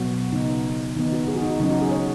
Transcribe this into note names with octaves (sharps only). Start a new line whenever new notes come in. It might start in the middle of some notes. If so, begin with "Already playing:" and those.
Already playing: B2 F#3 B3 F#4
C#3 B3 D#4
D#3 B3 D#4
F#4
G#4
F#4
D#4
F#4
C#3 F#3 C#4 D#4
F#4
G#4
C#5